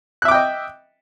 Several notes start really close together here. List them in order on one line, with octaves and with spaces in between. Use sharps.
F#6 E5 D6 G5 D#5